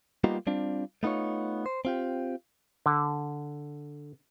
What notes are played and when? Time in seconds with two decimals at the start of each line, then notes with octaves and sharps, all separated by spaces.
0.24 G3 A#3 B3 D#4 F4 G4
0.47 G3 C4 D4 F4
1.03 A3 B3 D#4 F4 C#5
1.66 C5
1.85 C4 F4 G4
2.86 D3